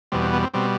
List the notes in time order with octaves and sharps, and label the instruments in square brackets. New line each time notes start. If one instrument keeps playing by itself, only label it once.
[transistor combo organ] E2 B2 G3 C4
C4
B3
C4
B2 G3 C4